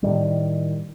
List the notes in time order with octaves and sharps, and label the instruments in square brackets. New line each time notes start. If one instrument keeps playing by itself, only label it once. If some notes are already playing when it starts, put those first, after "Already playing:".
[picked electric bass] A2 D#3 G3